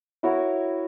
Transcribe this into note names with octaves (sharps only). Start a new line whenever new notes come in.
E4 F#4 A#4 C#5